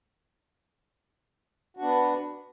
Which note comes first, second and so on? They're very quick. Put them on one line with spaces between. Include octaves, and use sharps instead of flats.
F#4 D4 B3